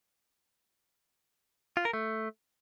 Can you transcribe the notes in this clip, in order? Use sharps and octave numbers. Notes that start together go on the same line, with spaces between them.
F4
A#4
A3